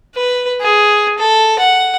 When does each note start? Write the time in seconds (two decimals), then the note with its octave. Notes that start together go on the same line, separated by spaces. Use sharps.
0.15 B4
0.61 G#4
1.19 A4
1.59 F#5